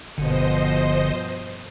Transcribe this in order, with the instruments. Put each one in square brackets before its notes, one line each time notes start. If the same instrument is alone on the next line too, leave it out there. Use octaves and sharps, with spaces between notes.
[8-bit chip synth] G1 D3 [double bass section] G2 B2 F3 [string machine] C5 D#5